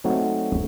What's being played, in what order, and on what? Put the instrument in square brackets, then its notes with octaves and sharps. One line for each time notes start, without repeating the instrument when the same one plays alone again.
[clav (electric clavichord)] F#3 A3 C4 D#4 F#4